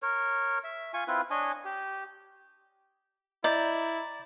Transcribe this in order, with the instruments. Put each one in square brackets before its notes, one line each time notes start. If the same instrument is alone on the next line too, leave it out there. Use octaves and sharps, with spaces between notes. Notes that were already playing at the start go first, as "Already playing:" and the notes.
[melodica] A#4 C#5
E5
F4 G#5 C#6
C4 E4 F4 B4
D4 C#5 D#5 G#5
G4
[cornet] E4 [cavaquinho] D5 [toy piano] D#5 [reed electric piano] A#5 G6